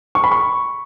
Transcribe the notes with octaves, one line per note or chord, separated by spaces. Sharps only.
C#6
B5
C#6